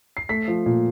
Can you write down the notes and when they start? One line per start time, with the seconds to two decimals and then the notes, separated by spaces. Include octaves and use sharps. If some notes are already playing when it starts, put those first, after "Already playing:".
0.17 C7
0.29 A3 B6
0.48 F3
0.66 A#2